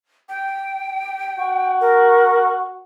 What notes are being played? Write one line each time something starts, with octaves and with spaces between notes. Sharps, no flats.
G5
F#4
A#4